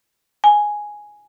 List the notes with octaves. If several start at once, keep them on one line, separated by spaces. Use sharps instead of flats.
G#5